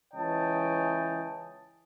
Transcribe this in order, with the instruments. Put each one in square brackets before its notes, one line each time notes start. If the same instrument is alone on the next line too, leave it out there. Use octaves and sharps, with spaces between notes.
[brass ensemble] C#2 E3 C#5 D#5 G5 A5